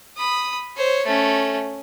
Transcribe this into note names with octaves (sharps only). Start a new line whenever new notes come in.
B5 D#6
C5 C#5
A3 C#4